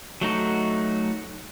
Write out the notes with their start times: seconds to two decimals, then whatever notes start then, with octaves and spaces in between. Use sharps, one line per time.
0.21 F#3 A3 D#4 F#4